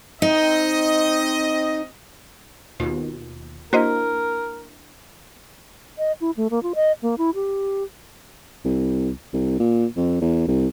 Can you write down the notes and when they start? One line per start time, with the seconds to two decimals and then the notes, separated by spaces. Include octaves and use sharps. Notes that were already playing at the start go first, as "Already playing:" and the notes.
0.22 C4 D#4 D#5
2.80 D#2 B2 F4
3.73 A#3 D4 E4 F#4 A#4 C5 D#5
5.98 D#5
6.21 E4
6.37 A3
6.51 A#3
6.63 F4
6.75 D#5
7.02 A#3
7.18 E4
7.35 G4
8.65 C2
9.33 C2
9.59 A#2
9.97 F2
10.21 E2
10.48 C2